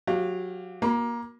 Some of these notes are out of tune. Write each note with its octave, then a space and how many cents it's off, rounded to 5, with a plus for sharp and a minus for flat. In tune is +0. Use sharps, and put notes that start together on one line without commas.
F#3 -20 G4 +0 F5 +0
A#3 +20 B5 -30